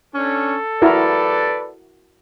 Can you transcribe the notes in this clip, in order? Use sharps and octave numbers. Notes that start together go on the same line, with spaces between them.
C#4 D4 A4
E4 F#4 A#4 B4 D5